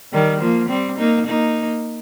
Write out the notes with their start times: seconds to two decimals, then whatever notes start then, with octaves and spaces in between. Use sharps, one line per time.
0.12 D#3 G3
0.41 F3 A#3
0.69 G3 C4
0.98 A#3 D#4
1.26 A#3 D#4